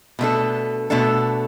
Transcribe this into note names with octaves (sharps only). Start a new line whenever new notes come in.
B2 A3 D4 A4
B2 A3 D4 A4